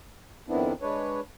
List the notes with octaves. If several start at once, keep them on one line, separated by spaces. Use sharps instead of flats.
F2 D#3 B3 C4 D4 E4
G#3 D4 B4 C#5